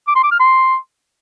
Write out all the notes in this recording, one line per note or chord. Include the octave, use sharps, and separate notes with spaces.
D6
C6
D6
F6
C6